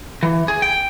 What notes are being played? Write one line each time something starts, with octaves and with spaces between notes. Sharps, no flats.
E3
G#4
G5